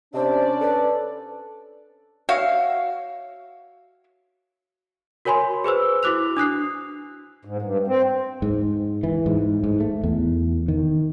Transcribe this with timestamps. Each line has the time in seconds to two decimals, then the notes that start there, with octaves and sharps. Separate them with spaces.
0.14 C3 C#4 D4 C5 D5
0.61 A4 B4
2.29 F#4 C#5 E5 F5
5.25 F#4 A#4 C#5 G#5 B5 C6
5.64 G#4 B4 C5 E6
6.03 E4 F#4 D6 F#6 F7
6.37 D4 D#6 F#6 C7
7.45 G#2
7.62 G2
7.87 C4
8.42 G#2
9.03 E3
9.26 G#2
9.63 G#2
9.80 A3
10.03 E2
10.68 D#3